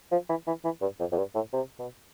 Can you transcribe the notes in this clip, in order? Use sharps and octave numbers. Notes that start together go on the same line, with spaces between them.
F3
E3
E3
E3
G2
F2
F2
G2
A2
C3
B2